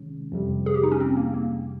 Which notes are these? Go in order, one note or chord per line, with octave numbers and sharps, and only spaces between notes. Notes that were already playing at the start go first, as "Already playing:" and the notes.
Already playing: C3 D#3 G#3 C#4
F2 C3 G3
G#4
G4
D#4
C#4
C4
A#3
A#3